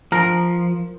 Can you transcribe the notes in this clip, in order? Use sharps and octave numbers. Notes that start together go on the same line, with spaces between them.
F3 A#4